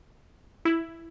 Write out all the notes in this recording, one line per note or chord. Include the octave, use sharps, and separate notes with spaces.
E4